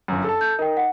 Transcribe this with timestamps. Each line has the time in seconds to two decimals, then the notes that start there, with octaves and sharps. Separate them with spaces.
0.08 G1 F#2
0.24 A4 A5
0.41 G6
0.59 D#4 A#4 G5
0.77 F#5